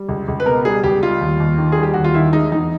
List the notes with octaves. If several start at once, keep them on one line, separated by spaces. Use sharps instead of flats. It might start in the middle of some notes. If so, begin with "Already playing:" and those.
Already playing: G3
C#2
C#2
B4
B2 A#4
G3 G#4
C#2 G4
G3 F4
D#2
D#2
D#3
G3 G#4
G4
D#2 F#4
F4
D#3 E4
G#3 D#4
E2 D#4